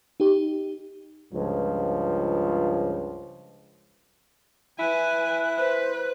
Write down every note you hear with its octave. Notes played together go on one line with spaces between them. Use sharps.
D#4 G4
C#2 G2 F3
E4 B4 G#5 F#6
B4 C5